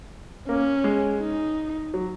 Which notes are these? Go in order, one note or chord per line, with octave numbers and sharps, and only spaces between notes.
A#3 C#4
G#3
D#4
F#3